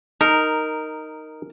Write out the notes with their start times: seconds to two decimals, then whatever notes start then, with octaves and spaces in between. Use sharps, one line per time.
0.21 D#4 A#4